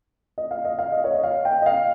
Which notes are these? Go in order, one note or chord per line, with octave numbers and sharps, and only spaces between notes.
D#5
F5
D#5
F5
D#5
C#5
D#5
F5
G5
D#5
F5